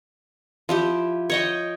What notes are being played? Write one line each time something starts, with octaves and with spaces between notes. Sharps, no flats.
F3 E4 G4
C#5 D#5 G5